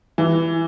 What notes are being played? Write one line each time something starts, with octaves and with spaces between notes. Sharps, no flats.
E3